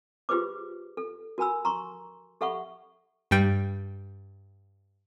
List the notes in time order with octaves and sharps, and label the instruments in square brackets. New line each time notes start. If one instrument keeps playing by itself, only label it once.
[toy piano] F4 G4 G#4 B4 C5 D6
A4
F#4 A#4 G#5 B5 E6
A#5 C6 C#6
G4 A4 E5 F#5 B5 C#6
[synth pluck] G2 G3 G5